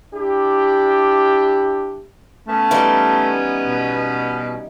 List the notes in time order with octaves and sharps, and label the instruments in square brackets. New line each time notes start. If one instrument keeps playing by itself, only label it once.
[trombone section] D4 E4 G4
[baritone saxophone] A3 [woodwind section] B3 C#4
[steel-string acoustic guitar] E3 G3 D#4
[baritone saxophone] B2